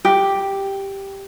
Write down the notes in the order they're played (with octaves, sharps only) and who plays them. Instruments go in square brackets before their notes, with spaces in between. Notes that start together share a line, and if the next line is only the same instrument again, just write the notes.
[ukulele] G4